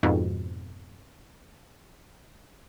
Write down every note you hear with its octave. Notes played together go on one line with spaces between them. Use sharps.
F2 G#2 B2